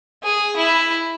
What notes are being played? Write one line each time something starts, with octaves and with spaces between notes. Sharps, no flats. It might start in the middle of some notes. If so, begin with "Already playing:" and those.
G#4
E4